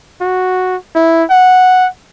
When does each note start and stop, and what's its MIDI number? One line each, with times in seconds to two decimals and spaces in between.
0.21 0.76 66
0.95 1.23 64
1.30 1.87 78